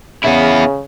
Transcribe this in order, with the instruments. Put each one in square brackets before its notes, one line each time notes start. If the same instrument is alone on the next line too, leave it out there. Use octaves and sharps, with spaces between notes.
[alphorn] C#3 [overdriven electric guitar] B3 E4